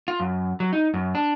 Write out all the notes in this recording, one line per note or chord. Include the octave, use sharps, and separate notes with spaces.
F4
F#2
F#3
D#4
F#2
D4